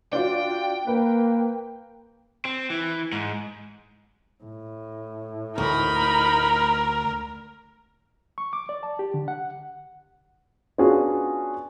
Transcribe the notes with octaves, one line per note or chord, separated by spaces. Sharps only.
D4 F4 F#4 G5
A#3 B4
C4
E3
G#2
A2
D2 D#4 A#4 B5
C#6
D6
D5
A5
G4
D3
F#5
B3 C#4 D4 F4 F#4 G#4